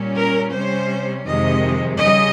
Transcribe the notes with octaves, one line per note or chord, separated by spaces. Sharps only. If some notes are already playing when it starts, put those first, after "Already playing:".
Already playing: A#2 G3 C#4
A#4
C3 G3 C#4 C5
F2 C3 D#3 G#3 D#5
C#3 G3 D#5